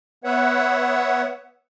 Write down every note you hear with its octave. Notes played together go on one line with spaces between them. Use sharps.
B3 B4 C#5 E5 F#5